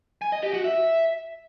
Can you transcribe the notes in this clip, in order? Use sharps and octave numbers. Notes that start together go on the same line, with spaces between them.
G#5
D#5
G4
F#4
E5